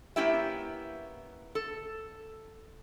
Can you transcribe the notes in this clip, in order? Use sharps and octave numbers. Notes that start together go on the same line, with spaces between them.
A#3 B3 C#4 E4 G4 E5
A4